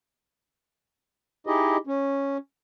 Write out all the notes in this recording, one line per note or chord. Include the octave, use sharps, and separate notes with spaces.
D#4 E4 G4 G#4 D#5
C#4